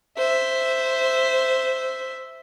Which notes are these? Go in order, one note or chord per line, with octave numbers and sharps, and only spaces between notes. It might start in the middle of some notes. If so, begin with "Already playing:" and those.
C5 E5